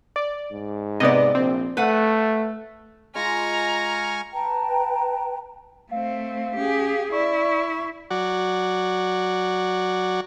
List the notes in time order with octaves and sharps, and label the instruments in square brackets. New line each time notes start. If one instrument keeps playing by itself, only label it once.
[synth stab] D5
[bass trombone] G#2
[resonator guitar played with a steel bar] C3 D5 [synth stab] B3 D#5
[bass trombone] A#1 [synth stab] C4
[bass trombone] A3 [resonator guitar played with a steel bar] B4 F#5
[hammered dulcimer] G#3 F4 B5 [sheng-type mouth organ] G#5 C#6 F6 [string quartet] A#5
[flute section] B4 G5 A5 A#5
[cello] A3 C4 [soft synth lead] F5
[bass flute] C#4 [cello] G4 G#4
[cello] E4 [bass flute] D5 [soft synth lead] C#6
[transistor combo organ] F#3 F#4 D5